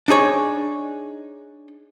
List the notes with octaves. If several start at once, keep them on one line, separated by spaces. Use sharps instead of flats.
D4 D#4 G#4 C#5